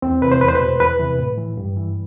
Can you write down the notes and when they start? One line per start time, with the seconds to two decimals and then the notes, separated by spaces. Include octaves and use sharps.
0.02 E2 C4
0.21 C3 E3 B4
0.32 C5
0.41 E2 B4
0.48 C5
0.55 B4
0.60 B2
0.80 E2 B4
0.99 C3 E3
1.19 A2
1.38 E3
1.57 G2
1.76 E3